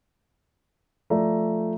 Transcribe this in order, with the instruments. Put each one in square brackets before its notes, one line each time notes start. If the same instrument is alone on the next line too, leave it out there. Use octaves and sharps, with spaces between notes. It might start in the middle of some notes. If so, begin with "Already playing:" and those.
[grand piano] F3 A3 D5 A#5